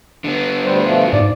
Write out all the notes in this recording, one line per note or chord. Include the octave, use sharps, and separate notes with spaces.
D3 B3
D2 G3 C5
B2 F3 A3
G#2 D5